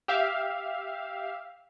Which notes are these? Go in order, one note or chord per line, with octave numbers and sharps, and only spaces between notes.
G4 E5 F5